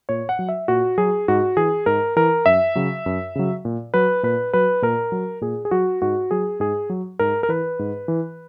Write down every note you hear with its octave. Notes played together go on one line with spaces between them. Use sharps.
A#2 C#5
F#5
F#3
E5
A#2 F#4
F#3 G#4
G#2 F#4
E3 G#4
G#2 A#4
E3 A#4
F#2 E5
C#3 F#3
F#2
C#3 F#3
A#2
F#3 B4
A#2 B4
F#3 B4
A#2 A#4
F#3
A#2 G#4
G#4
F#3 F#4
G#2 F#4
F#3 G#4
G#2 G#4
F#3
G#2 A#4
A#4
E3 B4
G#2
E3